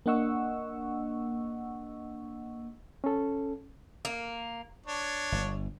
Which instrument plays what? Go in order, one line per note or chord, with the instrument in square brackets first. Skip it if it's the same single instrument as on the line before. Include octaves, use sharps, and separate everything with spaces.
[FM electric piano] A#3 D4 D#5 F#5 C#6 E6
[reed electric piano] C#4 A4
[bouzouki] A#3
[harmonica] D4 C#5
[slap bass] G1